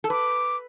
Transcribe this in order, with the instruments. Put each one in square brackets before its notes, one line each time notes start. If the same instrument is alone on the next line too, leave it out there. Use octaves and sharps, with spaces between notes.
[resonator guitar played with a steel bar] A4
[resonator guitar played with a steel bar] B4 [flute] D6